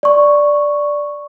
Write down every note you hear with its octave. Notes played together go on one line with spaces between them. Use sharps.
D5 C#6